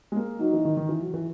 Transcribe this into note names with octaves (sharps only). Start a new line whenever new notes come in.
G#3
A#3
F#3 D#4
E3
D#3
D#3
E3
F#3
E3